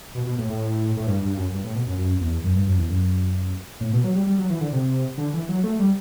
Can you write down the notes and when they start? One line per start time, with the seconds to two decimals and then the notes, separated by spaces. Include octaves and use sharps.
0.15 B2
0.26 B2
0.38 A2
0.50 A2
0.97 A2
1.07 G2
1.22 G2
1.37 F#2
1.52 G2
1.64 A2
1.75 B2
1.87 F#2
1.98 F#2
2.21 E2
2.44 F#2
2.55 G2
2.67 F#2
2.78 E2
2.89 F#2
3.80 A2
3.93 B2
4.04 F#3
4.15 G3
4.27 G3
4.38 F#3
4.50 E3
4.61 D3
4.73 C3
5.18 D3
5.33 E3
5.49 F#3
5.64 A3
5.79 G3